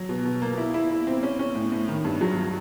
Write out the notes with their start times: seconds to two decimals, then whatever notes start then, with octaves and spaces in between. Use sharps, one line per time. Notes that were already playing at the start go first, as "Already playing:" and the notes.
Already playing: F#3
0.09 B2
0.25 B2
0.42 A#3
0.58 E4
0.74 E4
0.91 E4
1.07 C4
1.23 C#4
1.39 C#4
1.55 A2
1.72 A2
1.88 D#3
2.05 G2
2.21 F#3